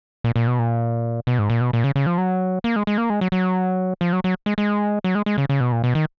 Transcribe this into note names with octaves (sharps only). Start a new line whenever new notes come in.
A#2
A#2
B2
A#2
B2
G#2
A#2
B2
A#2
C#3
C#3
F3
F#3
A#3
G#3
G#3
A#3
G#3
F#3
F#3
F3
F#3
F#3
G#3
G#3
F#3
G#3
G#3
C#3
C#3
B2
A#2
B2
D#3